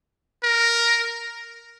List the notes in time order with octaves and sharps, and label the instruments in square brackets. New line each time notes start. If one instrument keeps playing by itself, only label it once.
[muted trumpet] A#4